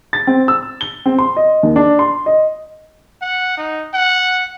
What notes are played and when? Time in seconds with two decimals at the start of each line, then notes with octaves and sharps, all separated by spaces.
0.13 A6
0.27 C4
0.48 E6
0.81 G7
1.06 C4
1.19 C6
1.36 D#5
1.63 D#2
1.76 D4
1.99 C6
2.26 D#5
3.22 F#5
3.57 D#4
3.94 F#5